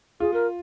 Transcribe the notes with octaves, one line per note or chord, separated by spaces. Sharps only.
F4 G#4
A#4